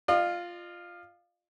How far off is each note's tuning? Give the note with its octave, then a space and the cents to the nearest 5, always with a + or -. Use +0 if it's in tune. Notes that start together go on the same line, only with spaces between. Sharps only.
F4 +0 D#5 -45